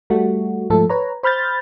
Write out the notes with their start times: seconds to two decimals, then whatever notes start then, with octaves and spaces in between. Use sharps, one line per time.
0.10 G3 A3 F#4
0.70 G#2 F3 A3 A4
0.90 B4 C#5 A#5
1.23 C5 B5 F6 G6 A6